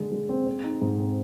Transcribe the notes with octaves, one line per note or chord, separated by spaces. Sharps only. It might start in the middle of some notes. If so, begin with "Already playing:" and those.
Already playing: D3 G#3
G#3
C4
C4
D#4
G#2
C4